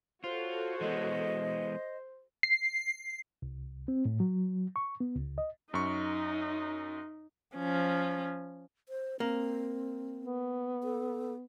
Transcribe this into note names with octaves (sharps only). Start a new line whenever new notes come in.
F4 F#4 A4 C5 C#5
E3 G#3 B3 D#5
C7
C2
C4
A2
F#3
C#6
B3
C#2
D#5
F#2 D#4 C#6
F3 C#4
C5
A#3 C4
B3
A4